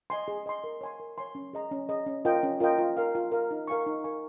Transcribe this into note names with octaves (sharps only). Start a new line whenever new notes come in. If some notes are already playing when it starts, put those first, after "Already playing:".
D#5 G#5 C6
G#4
D#5 G#5 C6
A#4
C#5 G#5 C6
A#4
C#5 G#5 C6
C#4
G#4 D#5 A#5
C#4
G#4 D#5 A#5
C#4
F4 A#4 D#5 G5
C#4
F4 A#4 D#5 G5
F4
A#4 F5
F4
A#4 F5
D#4
A#4 F5 G#5 C#6
D#4
A#4 F5 G#5 C#6